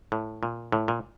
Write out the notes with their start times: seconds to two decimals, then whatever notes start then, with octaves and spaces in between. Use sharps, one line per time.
0.12 A2
0.43 A#2
0.72 A2
0.88 A#2